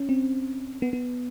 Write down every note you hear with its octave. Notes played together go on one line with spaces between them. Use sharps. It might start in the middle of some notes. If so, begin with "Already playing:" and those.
Already playing: C#4
C4
B3
B3